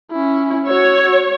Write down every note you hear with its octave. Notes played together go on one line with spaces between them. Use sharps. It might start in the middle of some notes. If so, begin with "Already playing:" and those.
C#4 E4
F#4 C#5 E6